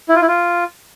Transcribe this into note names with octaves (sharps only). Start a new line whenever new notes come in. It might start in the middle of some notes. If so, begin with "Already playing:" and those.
E4
F4
E4
F4